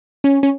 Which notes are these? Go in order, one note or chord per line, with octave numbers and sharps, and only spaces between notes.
C#4
C#4